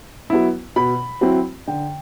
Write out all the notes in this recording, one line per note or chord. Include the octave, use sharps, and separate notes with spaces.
F#3 B3 E4
B2 B5
F#3 C4 E4
D3 G5